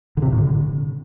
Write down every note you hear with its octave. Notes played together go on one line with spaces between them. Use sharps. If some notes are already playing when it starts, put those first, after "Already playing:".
D3
C3
A#2
A2
D3